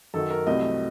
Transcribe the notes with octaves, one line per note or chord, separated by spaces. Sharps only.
F#2 D#3 F#3 A4
A#4
C2 C3 F#3 A3 C4 D#5